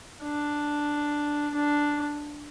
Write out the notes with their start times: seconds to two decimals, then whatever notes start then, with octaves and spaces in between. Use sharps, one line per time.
0.23 D4
1.54 D4